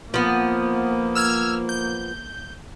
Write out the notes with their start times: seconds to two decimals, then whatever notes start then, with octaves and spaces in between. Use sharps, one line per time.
0.14 F3 A#3 B3
1.15 E6 F6 G#6
1.69 G6